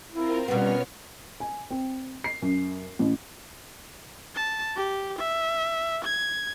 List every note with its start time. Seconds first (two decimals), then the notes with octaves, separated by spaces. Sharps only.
0.12 C4 E4 F4 A#4
0.48 B2 G3 B3 C#4 C#5 F6
1.40 G#5
1.71 C4
2.24 C7
2.42 F#2
2.99 A1
4.35 A5
4.77 G4
5.19 E5
6.05 G#6